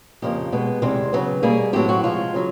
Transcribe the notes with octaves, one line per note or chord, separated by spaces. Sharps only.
F2 C#3 F3 A#3 G4
B2 G#3 B3
E2 C3 D#3 G#3 C4
C#3 F#3 B3
B2 G3 A#3 G#4
A2 F#3 A3 C4 G4
F#4
C3 F3 G#3 F4
C#3 F#3